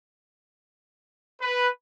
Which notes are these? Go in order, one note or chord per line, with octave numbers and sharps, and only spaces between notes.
B4